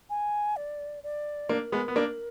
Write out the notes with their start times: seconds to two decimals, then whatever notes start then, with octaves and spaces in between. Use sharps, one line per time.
0.10 G#5
0.56 D5
1.03 D5
1.49 A#3 D4 A#4
1.72 G#3 B3
1.88 B3
1.96 A#3 D4